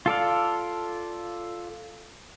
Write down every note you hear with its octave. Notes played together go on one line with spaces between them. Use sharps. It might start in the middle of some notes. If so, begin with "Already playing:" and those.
F4 A4 D5 F5